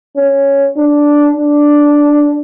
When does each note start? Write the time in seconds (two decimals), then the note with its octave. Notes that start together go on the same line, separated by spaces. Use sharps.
0.17 C#4
0.77 D4
1.37 D4